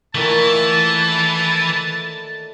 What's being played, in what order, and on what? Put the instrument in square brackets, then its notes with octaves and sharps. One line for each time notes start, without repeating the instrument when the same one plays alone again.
[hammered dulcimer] A#2 D#3 A3 [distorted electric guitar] E3 [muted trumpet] A5